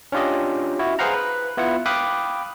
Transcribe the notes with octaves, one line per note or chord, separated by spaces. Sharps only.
C#4 D4 F4 G4 D#5
E4 F#4
G#4 B4 C5 F5 F#5 A#5
B4
B3 E4 F4 F#5
F5 G5 B5 D6 D#6 F#6